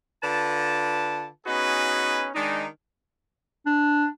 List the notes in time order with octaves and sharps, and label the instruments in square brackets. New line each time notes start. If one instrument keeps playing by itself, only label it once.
[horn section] D3 F4 B4 A5
B3 C#4 D#4 F#4 G#4 B4
D#3 G#3 D4 D#4
[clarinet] D4